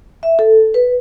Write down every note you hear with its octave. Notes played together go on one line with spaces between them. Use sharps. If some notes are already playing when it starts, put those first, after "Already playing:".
E5
A4
B4